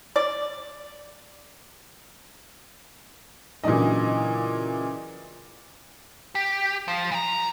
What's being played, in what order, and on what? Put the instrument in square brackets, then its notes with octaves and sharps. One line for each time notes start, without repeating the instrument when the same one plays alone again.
[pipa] D5
[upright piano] A#2 C#3 E3 F#3 D4 D#5
[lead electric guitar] G4
F3
E3 A#5